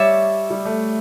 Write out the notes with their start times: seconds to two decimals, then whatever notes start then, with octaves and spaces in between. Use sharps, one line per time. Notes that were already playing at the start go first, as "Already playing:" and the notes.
Already playing: G3 C#5 E5 A5 D6
0.50 G3
0.65 A3